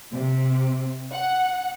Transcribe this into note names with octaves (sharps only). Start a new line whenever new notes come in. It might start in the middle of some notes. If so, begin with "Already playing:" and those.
C3
F#5